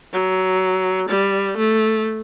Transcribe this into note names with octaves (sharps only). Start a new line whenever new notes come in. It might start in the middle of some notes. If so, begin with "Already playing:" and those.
F#3
G3
A3